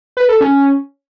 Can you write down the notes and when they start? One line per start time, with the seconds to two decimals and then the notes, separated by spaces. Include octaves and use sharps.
0.17 B4
0.29 A4
0.41 C#4